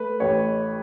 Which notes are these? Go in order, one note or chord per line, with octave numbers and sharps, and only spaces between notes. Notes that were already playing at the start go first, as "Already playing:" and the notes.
Already playing: A3 B4
A1 C#5